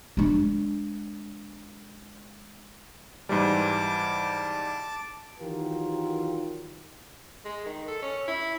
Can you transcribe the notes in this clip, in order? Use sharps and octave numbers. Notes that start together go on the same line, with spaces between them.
G#3 D4
G#2 E3 G3 A5 D6
D#3 E3 F#3 F4 G4 A#4
G#3
D#3
A4
C#4
E4